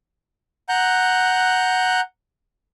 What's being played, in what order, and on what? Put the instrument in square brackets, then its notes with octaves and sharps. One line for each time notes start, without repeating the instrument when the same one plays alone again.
[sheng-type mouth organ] F#5 A#5 F#6 G6